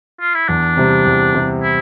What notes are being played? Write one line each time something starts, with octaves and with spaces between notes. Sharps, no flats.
F4
E4
E2 D4
C3 G3 C4
E2
C3 G3 C4
E4